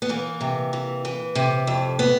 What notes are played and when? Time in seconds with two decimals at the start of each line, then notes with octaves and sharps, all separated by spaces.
0.02 B3
0.09 E3 A#3
0.41 C3
0.73 E3
1.05 E3
1.35 C3
1.67 F2
1.99 B3